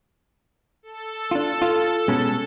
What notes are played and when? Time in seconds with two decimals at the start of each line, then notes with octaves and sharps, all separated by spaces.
0.83 A4
1.31 D4 F4
1.62 F4
2.08 B2 G#3 C#4